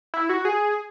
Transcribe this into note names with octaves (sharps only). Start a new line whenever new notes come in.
E4
F#4
G#4